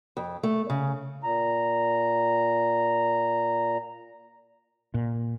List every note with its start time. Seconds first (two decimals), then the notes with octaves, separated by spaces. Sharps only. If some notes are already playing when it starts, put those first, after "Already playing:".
0.17 F2
0.43 A3
0.70 C#3
1.23 A#2 A#5
4.94 A#2